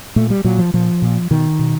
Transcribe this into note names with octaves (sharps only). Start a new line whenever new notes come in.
A#2 A3
G3
A#2 F#3
F3
A#2 F3
A#2
B2 D#3
B2